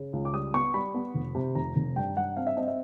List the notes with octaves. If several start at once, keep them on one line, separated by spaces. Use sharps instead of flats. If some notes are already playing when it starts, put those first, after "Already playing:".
Already playing: C#3
C#2
D6
G3 D#6
B3 C#6
G3 B5
B3
F1
C3
F1 A#5
F1
G2 G5
G2 F#5
C4 F5
E5
C4 D#5
E5